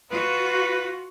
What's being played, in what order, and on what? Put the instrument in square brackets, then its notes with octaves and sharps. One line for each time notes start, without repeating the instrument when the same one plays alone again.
[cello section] F4 F#4 [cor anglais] B4